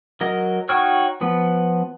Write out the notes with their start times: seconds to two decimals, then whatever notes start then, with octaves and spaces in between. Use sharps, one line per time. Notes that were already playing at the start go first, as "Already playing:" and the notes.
0.21 F#3 A#4 D#5
0.69 D#4 F#4 C#5 G5 F6
1.21 F3 B3